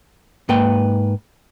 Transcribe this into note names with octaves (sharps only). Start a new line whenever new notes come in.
G#2 A#3 B4 G5